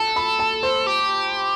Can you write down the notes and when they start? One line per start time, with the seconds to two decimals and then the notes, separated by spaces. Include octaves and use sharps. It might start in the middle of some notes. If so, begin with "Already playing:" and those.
Already playing: A4 A5
0.16 B5
0.39 A5
0.63 C5
0.87 G4